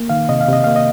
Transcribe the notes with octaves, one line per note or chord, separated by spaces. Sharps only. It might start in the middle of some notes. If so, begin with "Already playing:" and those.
Already playing: A#3
D#3 F5
C3 D#5
F5
C3 D#5
A#3 F5
D#5